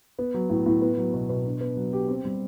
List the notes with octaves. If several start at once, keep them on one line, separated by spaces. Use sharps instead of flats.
B3
F#3
A2
A2
B3
F#3
B2
B2
D4
B3
F#3
G4
C4
G3